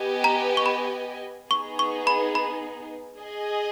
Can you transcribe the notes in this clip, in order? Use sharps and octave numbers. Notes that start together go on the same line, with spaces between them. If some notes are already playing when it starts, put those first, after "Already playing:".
Already playing: B3 G4 B4 D#5 G#5
A#5
C#6
B5
B3 D#4 G#4 C#6
C#6
B5
B5
G#4 D#5 G#5